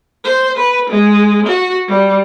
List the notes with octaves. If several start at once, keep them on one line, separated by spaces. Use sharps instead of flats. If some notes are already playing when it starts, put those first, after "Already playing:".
C5
B4
G#3
F#4
G3